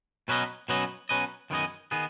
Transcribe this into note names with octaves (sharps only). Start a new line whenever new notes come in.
B2 F#3 C#4 B4 D#5
B2 F#3 C#4 B4 D#5
B2 F#3 C#4 B4 D#5
F#2 D#3 B3 G#4 D#5
D#3 B3 G#4 D#5